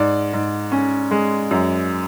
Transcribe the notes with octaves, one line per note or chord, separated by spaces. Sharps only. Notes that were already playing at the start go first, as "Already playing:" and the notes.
Already playing: G#2 D5
G#2
C#4
G#3
F#2